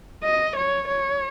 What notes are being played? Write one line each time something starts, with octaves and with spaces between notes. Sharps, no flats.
D#5
C#5
C#5